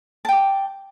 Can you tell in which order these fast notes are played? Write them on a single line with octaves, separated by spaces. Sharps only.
A5 G5 D6